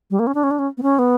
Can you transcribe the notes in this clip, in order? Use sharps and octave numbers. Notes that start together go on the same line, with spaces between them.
G3
A#3
C#4
D4
C#4
D4
C#4
B3
C#4
B3